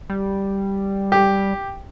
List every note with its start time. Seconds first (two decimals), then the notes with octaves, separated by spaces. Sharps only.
0.10 G3
1.12 G4